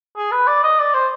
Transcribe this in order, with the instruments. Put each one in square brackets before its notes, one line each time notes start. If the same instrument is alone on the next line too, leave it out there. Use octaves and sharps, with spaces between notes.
[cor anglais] G#4
B4
D5
D#5
D5
C5